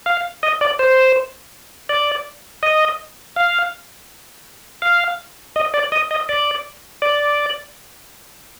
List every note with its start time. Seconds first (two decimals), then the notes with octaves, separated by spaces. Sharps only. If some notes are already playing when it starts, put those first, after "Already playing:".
0.06 F5
0.43 D#5
0.61 D5
0.79 C5
1.89 D5
2.63 D#5
3.36 F5
4.82 F5
5.56 D#5
5.74 D5
5.92 D#5
6.11 D#5
6.29 D5
7.02 D5